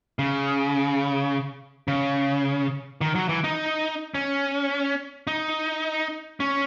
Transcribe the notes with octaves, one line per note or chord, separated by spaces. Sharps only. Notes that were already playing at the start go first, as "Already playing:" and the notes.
C#3
C#3
D#3
F#3
E3
D#4
C#4
D#4
C#4